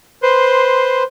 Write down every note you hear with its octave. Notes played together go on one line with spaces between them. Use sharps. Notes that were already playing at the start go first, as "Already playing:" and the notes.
B4 C5 C6